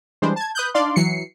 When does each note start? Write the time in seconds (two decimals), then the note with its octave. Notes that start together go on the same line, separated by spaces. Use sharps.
0.22 E3 G3 G#3 D4 C5
0.36 A5 G#6
0.55 B4 D#6 F#6 G6
0.74 D4 D#4 D5 F5 C6
0.96 E3 F#3 C7 C#7